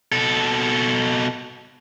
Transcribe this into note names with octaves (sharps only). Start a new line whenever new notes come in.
B2 A4